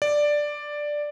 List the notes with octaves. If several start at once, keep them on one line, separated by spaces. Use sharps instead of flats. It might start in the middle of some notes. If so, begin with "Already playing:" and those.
D5